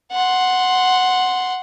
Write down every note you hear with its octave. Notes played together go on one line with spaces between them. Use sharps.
F#5 C6